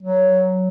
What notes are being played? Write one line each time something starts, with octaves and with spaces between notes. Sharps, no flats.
F#3